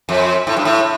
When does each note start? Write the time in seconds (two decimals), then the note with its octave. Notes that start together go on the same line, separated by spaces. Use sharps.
0.09 F2
0.47 A2
0.57 G2
0.65 A2